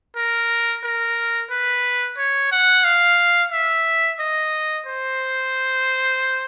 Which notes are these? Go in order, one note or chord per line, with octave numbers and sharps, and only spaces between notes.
A#4
A#4
B4
C#5
F#5
F5
E5
D#5
C5